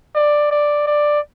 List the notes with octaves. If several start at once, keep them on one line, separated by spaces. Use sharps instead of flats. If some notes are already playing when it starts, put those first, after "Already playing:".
D5
D5
D5